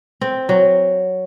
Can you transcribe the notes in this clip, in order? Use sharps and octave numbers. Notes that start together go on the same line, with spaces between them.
C4
F#3